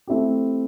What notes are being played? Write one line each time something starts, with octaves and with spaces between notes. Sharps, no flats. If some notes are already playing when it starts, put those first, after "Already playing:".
A3 C4 E4 G4